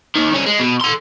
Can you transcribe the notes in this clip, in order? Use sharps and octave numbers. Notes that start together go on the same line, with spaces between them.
D#2 D#3
C2 C#4
G#3
B2
A4 C6